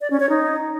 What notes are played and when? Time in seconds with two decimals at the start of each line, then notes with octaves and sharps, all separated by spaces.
0.01 D5
0.10 C#4
0.20 C#5
0.29 D#4